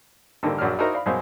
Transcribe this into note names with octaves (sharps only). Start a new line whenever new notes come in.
G#1 D3 G3 A#3 A#4
A#1 F#2 F#3 D4 F6
D#4 E4 F#4 A#4 C5 D#5
D5 F5 B5
F#2 B2 G#3 C5 D#5 F5